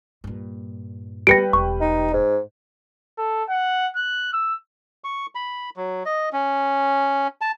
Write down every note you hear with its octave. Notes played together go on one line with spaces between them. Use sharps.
G2 A#2
G3 A#3 B3 B4 G5 A#6 C#7 D7
E1 C#6
D#4
G#2
A4
F#5
F#6
E6
C#6
B5
F#3
D#5
C#4
A5